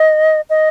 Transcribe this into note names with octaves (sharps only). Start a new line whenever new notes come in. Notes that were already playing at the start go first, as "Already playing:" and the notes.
Already playing: D#5
D#5